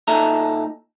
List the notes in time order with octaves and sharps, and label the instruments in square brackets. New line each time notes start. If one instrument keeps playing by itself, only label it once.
[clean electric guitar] A#2 D#4 A4 E5 A#5